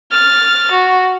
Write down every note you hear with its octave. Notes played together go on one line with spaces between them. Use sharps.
F6 A6
F#4